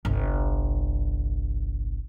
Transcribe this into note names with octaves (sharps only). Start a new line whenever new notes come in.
G1 C2